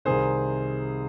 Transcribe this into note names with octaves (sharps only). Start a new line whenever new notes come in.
C2 C3 D#3 G#4 C5